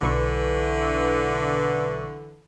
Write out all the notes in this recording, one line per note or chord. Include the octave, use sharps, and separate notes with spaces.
B1 D3 E3 B4 C#6